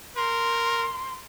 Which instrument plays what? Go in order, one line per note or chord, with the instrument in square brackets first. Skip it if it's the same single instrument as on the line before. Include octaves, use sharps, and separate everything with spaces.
[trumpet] A#4 [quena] C6